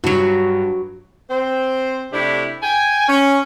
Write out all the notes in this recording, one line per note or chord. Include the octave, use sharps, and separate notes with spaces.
G2 F#3 F#4
C4 C5
C3 A3 D4 E4 G4
G5 G#5
C#4